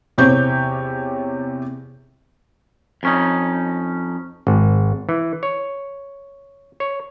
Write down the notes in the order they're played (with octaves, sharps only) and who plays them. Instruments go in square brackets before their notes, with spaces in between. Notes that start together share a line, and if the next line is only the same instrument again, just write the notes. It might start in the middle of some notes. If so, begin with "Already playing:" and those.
[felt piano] E2 C3 C4 G4 C#5 G6
[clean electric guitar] F2 C#4 D#4
[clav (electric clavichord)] G#1
E3
C#5
C#5